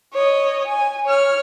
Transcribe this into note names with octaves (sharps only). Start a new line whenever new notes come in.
C#5 D#5
G#5
C#5 F6